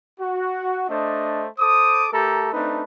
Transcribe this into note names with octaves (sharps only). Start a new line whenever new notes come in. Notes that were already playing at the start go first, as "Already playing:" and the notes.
F#4
A3 D4 C5 D#5
A4 C5 D6 D#6
A3 G4 A4 A#4 A#5
A3 C4 D4 D#4 B4